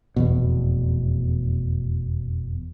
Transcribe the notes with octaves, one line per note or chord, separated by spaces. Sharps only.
F1 E2 B2